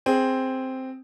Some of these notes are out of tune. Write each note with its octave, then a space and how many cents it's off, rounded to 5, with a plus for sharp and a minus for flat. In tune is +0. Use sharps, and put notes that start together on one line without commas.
C4 +0 G#4 +0